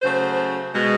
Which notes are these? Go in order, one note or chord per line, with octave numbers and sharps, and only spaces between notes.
C#3 F#3 A3 C5
B2 G#3